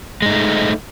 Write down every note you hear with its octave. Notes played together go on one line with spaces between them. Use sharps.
G#3 A3 D#4